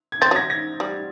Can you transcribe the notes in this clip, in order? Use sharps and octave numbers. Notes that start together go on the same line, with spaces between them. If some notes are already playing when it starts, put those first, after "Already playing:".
G#6
C4 G6 A6
F#3
G#6 A#6
G#6 A#6
G3